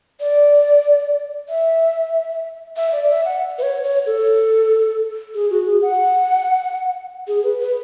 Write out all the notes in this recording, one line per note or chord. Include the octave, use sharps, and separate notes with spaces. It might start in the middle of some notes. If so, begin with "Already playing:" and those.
D5
E5
E5
D5
E5
F#5
B4
C#5
C#5
A4
G#4
F#4
G#4
F#5
G#4
B4
B4